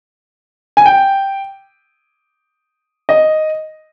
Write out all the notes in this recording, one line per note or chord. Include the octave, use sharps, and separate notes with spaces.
G#5
G5
D#5